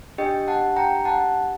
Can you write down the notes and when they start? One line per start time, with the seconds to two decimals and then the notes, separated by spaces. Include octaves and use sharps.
0.18 D4 G4 D#5 G5
0.48 F#5 A5
0.76 G5 A#5
1.05 F#5 A5